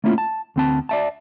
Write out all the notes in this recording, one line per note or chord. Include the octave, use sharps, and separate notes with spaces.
A3 A#3 C#4 E4 F4
A5
D2 C4 A5
D5 E5 A5